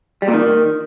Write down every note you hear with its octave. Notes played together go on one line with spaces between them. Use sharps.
G3
A#2
D#3